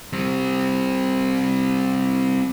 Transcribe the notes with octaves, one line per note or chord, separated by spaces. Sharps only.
G3 C4